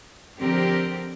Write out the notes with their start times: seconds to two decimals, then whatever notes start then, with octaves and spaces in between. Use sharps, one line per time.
0.38 D3 F3 C4 G4 A#4